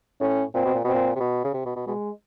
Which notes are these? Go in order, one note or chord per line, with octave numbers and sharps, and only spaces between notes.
A2 C#4
A#2 C4
B2
A#2
B2 C4
A#2
C3
B2
C#3
C3
B2
B2
B2 G#3